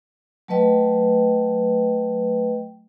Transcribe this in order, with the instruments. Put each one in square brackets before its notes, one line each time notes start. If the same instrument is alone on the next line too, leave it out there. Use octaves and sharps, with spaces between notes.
[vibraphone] F#3 A3 B4 D#5 G5